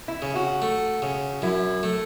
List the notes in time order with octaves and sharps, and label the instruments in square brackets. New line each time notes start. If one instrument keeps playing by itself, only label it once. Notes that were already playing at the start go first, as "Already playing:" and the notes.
[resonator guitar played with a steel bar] E4
[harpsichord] C#3
[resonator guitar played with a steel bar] F#4
[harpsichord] A3
C#3
[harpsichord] F#2 [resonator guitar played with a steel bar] E4
[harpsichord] A3